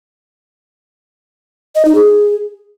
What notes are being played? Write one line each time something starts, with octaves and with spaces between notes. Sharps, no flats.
D#5
D#4
G#4